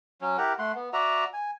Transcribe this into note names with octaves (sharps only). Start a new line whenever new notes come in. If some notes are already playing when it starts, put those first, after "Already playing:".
F#3 C#4
E4 G4 A#4 F#5
A3 F#5 C6
B3
F#4 D5 E5 A#5
G#5